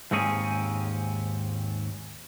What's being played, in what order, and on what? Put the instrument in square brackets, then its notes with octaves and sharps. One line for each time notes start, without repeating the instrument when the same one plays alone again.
[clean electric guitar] D#2 G#2 G#3 C4 C#4 G#4